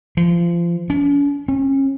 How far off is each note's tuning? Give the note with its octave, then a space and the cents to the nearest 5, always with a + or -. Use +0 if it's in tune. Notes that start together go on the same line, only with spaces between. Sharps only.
F3 -25
C#4 +45
C#4 -30